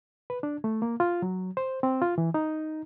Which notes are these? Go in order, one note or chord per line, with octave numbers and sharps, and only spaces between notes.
B4
D4
A3
A#3
F4
F#3
C5
C4
F4
E3
D#4